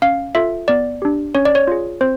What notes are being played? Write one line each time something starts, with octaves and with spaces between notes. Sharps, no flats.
C#4 F5
F4 A4 E5
B3 D5
D4 G4
C#4 C#5
D5
C#5
F4 G#4
C4 C5